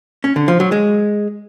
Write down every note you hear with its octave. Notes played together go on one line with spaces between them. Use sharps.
C#4
D3
F3
F#3
G#3